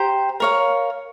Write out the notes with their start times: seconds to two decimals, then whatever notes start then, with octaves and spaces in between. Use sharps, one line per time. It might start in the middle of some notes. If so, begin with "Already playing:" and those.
Already playing: G4 C5 G5 A#5
0.40 A#4 C#5 F5